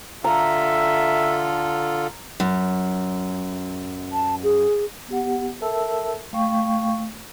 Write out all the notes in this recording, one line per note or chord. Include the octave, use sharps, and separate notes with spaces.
D3 F4 A4 E5 A#5
F#2
A5
G#4
B3 G4 F#5
A4 A#4 E5 A5 E6
A3 F5 G5 C#6